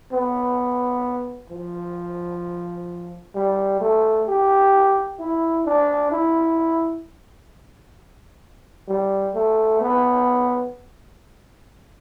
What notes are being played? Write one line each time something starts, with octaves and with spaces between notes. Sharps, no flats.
B3
F3
G3
A3
G4
E4
D4
E4
G3
A3
B3